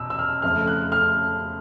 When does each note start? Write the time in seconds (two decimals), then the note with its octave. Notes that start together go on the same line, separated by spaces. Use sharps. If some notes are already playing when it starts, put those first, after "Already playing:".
Already playing: E2 B2 E6
0.10 E6
0.19 F6
0.42 F2 C#3 F3 A3 F6
0.67 F#6
0.92 F6